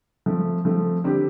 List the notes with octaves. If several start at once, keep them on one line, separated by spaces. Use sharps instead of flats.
F3 A3 C4
F3 A3 C4
D3 G3 C4 G4